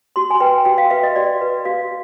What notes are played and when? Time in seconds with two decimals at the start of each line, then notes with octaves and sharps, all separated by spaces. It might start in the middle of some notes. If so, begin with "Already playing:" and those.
0.16 F#4 C6
0.30 G#5
0.40 B4 G5
0.65 F#4 G5
0.78 F5
0.90 B4 E5
1.03 D#5
1.15 F#4 D5
1.41 B4
1.65 F#4 F5